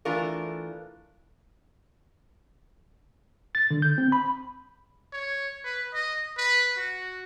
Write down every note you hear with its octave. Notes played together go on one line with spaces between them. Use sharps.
E3 A3 D4 F4 A#4
A6
D3
G6
C4
B5
C#5
B4
D#5
B4
F#4